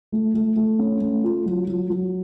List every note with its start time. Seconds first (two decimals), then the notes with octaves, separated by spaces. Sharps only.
0.12 A3
0.34 A3
0.56 A3
0.79 C#4
1.01 A3
1.23 F4
1.46 F#3
1.67 F#3
1.90 F#3